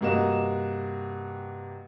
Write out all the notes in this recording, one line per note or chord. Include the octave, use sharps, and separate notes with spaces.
G2 C3 A#3 F#4 D#5 E7